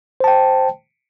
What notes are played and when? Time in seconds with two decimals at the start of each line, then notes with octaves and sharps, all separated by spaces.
0.20 C5
0.24 A5
0.28 G5